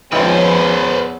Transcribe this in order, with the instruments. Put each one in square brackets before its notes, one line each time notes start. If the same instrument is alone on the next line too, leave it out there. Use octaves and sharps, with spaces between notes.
[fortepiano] G#1 F4 G5 [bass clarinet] E2 [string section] F3 C#4 [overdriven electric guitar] B4 C5